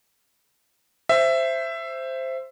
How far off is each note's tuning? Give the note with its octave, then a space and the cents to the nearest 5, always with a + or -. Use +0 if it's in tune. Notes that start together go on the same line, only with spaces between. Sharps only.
C5 +0 E5 +15